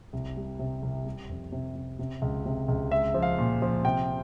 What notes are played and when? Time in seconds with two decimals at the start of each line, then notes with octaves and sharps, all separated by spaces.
0.13 C2
0.37 G3
0.59 C3
0.83 C2
1.05 G3
1.29 F2
1.52 C3
1.75 C3
1.99 C3
2.22 C#2
2.46 C3
2.69 C#2
2.91 G#3 E5
3.14 F3
3.22 F5
3.39 A#2
3.62 F3
3.85 C3 G5